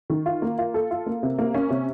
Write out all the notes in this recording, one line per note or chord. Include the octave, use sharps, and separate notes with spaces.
D#3
F4
A#3
F4
A4
F4
A#3
C3
A#3
C#4
C3